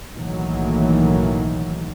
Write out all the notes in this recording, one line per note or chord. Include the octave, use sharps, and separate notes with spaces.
B1 A2 D#3 E3 F#3 A#3